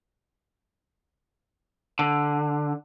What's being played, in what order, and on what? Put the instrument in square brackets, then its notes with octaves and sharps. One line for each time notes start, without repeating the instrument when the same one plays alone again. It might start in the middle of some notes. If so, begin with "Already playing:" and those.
[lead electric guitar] D3